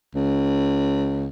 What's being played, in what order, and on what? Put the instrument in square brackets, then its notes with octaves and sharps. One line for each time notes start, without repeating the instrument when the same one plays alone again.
[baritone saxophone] C#2